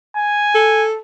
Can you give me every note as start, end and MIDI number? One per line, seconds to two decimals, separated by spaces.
0.17 0.85 80
0.55 0.97 69